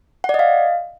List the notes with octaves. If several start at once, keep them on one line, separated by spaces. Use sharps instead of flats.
F#5
D5
D#5
F5